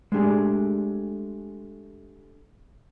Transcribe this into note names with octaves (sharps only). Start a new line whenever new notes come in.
G#3 A3 D4 G4 G#4